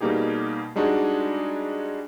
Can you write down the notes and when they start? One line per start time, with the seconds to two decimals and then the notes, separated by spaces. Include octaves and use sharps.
0.01 B2 G3 A#3 D#4 G4 G#4
0.76 G3 G#3 D4 D#4 F#4 G#4